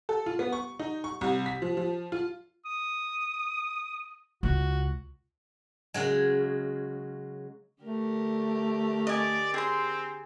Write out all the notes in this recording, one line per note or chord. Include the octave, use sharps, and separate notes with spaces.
A4
F4
B3
C#6
D#4
C#6
C2
B6
F3
F3
F4
D#6
C#2 F#4
C#3 F#3 G#3
D3 A3 G4 A#4
D5 D#5 G#5
C4 G#4 C6